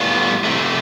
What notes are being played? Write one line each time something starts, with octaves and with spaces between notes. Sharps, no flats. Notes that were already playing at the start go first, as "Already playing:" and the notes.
Already playing: A2 G3 B3 F4
C3 F3 A3